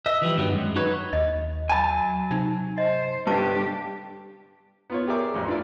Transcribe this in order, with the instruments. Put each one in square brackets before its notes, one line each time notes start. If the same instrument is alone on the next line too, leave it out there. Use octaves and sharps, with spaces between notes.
[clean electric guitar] D#5 E5
E3 F3 G3
G2 D#3 F#3 G3 B3
F#2 G#3
D#4 F#4 B4 C#5
[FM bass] D#2 [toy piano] D#5
[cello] F#3 [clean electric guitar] G#5 A5 [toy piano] B5
[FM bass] C3 [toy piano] D#4
[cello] C5 [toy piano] D#5
[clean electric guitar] G2 D3 [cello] D4 G4 [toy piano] A5 D6
[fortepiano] B3 F4 C#5
G4 G#4 A#4 D5 E5 D6
A1 F2
D4 E4 F4 D5